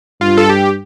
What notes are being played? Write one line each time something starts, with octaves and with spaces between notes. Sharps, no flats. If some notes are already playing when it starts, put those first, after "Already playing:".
G2 F4
A4
G4